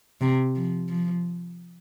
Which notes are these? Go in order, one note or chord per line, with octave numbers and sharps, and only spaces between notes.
C3
F3
F3